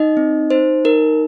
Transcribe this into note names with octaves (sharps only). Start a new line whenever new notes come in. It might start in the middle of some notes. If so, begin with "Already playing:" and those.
Already playing: D#4 D#5
C4
D#4 C5
D#4 A#4